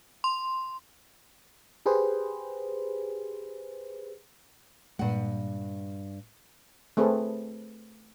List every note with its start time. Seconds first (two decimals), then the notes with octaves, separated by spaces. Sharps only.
0.24 C6
1.86 G4 G#4 B4 C5
4.99 G2 A#2 G#3 F#5
6.97 A3 C4 G#4 A4 B4